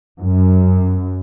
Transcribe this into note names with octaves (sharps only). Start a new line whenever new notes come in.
F#2